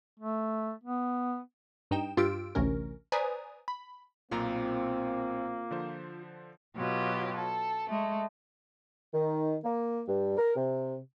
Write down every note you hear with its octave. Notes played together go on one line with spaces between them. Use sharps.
A3
B3
G2 D#4 G5 E7
G2 F4 G4 E6 D7
A1 D2 C3 C#4 A#4
B4 C5 D5 G#5 A#5 D#6
B5
B1 A#2 A#3 C4 F4 A#5
D3 F3 C5
B2 F#3 F4 G4
A4
G#3 A3
D#3
A#3
G2
A#4
C3